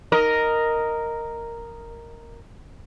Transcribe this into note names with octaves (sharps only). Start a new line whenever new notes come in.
A#4 D#5